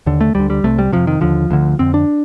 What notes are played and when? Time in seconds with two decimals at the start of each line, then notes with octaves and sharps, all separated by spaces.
0.06 D#2 D3
0.21 A3
0.35 D2 D3 G3
0.50 G3
0.64 C2 C3 A3
0.79 G3
0.92 F2 C3 F3
1.07 D#3
1.21 D#2 D3 F3
1.51 D2 D3
1.79 F2 D3 C4
1.94 D4